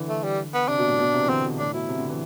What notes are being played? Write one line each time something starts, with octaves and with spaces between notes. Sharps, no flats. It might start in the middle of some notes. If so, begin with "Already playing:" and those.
Already playing: D3 E3
A3
G3
B3
C3 D4
B2
A2
B2
C3
E3
D3 C4
B2
A2 D4
B2 E4
C3
D3
E3